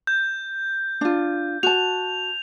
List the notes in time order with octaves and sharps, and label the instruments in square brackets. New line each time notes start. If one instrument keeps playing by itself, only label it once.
[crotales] G6
[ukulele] D4 F4
[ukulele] F#4 A5 [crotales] F7